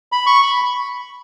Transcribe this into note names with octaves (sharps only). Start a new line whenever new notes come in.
B5
C#6
B5